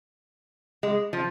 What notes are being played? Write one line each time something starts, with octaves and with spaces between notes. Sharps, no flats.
G#3
F3